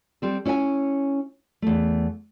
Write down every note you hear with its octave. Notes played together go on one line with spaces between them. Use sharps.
G3 C4 A4
C#4 E4 C#5 E5 G#5
E2 A3